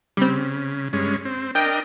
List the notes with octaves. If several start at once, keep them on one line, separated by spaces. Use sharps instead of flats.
C#3 G3 C4
G2 G#3 C#4
C4
D4 A#4 D#5 G5 G6 D7